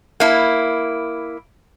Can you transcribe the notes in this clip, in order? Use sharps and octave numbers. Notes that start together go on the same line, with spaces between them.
A#3 E4